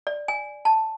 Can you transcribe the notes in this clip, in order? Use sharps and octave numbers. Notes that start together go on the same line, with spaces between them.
D5
G#5
A5